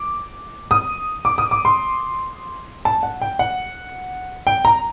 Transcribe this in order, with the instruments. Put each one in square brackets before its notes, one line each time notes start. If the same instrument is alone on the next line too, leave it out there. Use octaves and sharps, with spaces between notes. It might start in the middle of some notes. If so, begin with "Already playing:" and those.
Already playing: [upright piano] D6
D#6
D6
D#6
D6
C6
A5
F#5
G5
F#5
G5
A#5